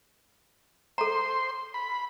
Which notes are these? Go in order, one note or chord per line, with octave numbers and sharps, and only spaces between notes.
A4 C5 A#5 C6
B5